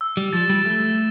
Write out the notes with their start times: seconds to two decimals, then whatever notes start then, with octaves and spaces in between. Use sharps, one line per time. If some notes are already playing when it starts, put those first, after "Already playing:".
0.01 E6
0.17 G3
0.33 F3 A6 E7
0.50 G3
0.65 A3 E6